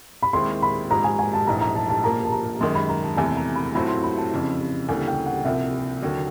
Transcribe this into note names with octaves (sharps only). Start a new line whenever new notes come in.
B5
D#2 D#3 G#3 C4 E4 C6
B5
G#2 F3 G#3 A#5
G#5
G#5
A5
A#1 G#2 E3 A3 A#5
A#5
A5
A5
A#2 F3 A#3 A#5
A5
A#5
F#2 D#3 G#3 C6
B5
A#5
A5
E2 C3 E3 A3 G#5
A#5
B5
A2 F#3 A3 C4 F4 B5
C6
B5
A5
F2 C#3 E3
D2 C#3 E3 G3 A#3 G#5
G5
F#5
C2 C3 F3 E5
D#2 D3 F#3